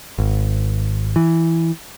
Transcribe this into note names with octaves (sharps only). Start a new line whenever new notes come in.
G#1
E3